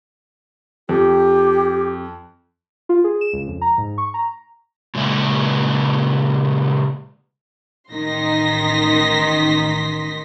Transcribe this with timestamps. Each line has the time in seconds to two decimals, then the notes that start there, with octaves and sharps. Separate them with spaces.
0.89 F2 G4
2.89 F4
3.04 G#4
3.21 E7
3.33 C#2
3.48 F2
3.61 A#5
3.78 G#2
3.98 C#6
4.14 A#5
4.95 A#2 C#3 G#3 E4
7.92 A1 D#3 D#4 C6 A#6 B6